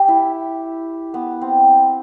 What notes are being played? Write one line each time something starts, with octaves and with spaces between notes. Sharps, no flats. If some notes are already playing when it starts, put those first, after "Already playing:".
Already playing: G4
E4
B3
C4